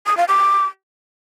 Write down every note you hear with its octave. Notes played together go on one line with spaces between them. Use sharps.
D#6
F5
D6